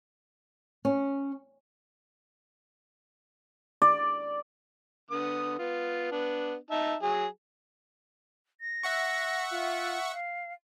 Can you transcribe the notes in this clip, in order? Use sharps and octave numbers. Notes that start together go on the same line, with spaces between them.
C#4
D5
D3 B3 D#6
B3 F4
B3 D4
D#4 E5 A5
F#3 G#4
A#6
E5 F#5 C#6
F4
F5